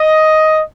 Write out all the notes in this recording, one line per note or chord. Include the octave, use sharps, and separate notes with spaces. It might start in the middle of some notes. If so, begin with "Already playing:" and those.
Already playing: D#5